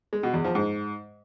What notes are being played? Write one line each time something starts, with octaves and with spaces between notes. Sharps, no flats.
G#3
B2
E2
F3
G#2